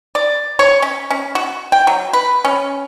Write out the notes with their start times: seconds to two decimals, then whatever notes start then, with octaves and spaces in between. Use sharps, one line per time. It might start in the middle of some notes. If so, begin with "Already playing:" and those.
0.15 D5
0.59 C#5
0.82 C#4
1.11 C#4
1.35 F#4
1.72 G5
1.87 F#3
2.13 B4
2.45 C#4